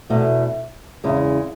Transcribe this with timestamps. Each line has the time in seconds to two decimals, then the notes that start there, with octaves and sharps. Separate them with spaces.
0.10 E2 B2 A3
1.04 E2 C#3 G#3